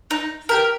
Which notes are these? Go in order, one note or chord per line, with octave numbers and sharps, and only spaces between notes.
D#4
G4 A#4